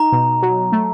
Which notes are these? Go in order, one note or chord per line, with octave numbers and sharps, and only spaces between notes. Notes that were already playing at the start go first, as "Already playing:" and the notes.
Already playing: D#4 A#5
B2
F#3
A3